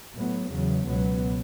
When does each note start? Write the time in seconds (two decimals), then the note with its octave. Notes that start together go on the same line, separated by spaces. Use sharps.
0.15 A2 F#3 B3
0.51 E2 C#3 F#3
0.87 C#2 B2 F#3 B3